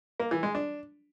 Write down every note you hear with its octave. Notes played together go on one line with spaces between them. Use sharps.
A#3
E3
G#3
D4